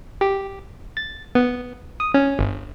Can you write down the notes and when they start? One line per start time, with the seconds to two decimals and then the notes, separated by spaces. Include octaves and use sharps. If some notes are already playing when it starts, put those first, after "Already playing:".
0.21 G4
0.97 A6
1.35 B3
2.00 D#6
2.14 C#4
2.39 G1